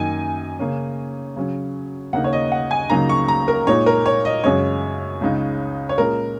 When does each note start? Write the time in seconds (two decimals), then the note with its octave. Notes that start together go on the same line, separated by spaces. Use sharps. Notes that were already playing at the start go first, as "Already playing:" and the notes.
Already playing: F#2 D#3 A#3 D#4 G#5
0.59 C#3 A#3 C#4
1.36 C#3 F#3 C#4
2.13 D#2 C#3 A#3 D#4 F#5
2.24 C#5
2.33 D#5
2.52 F#5
2.71 G#5
2.90 C#2 C#3 F#3 A#3 D#4 A#5
3.09 C#6
3.28 A#5
3.48 A#4
3.67 A#2 G#3 D#4 C#5
3.86 A#4
4.06 C#5
4.25 D#5
4.44 F#2 C#3 G#3 C#4 C#5
5.21 C#2 C#3 G#3 D#4
5.89 C#5
5.98 A#2 G#3 C#4 A#4